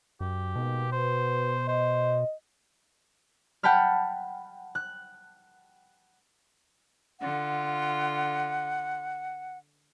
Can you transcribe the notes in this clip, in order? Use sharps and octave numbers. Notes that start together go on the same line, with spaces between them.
F#2 G4
G#2 B2 A#3 B3
F#4 B4 C5
C5 D#5
F#5 G5 A5 B5 F6
F#6
D3 F4 F#5